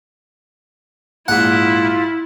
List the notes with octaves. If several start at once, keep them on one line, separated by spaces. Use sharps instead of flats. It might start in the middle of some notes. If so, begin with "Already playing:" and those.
A#1 G#2 E4 F4 F#5